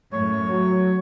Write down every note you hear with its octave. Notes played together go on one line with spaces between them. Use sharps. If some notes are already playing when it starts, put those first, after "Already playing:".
F#2 A2 C#5
F#3